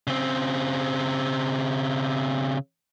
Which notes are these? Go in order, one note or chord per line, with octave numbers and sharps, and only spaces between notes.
C#3 C4